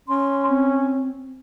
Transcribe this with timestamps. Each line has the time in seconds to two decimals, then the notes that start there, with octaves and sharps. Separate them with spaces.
0.09 C#4 C6
0.50 C4